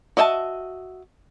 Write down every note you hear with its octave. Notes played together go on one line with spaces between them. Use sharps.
F#4 D#5 E5 G5 A5